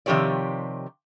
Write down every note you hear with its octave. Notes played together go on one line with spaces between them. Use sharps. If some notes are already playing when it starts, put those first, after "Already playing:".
C3 D#3 F3 G4 C#5 D5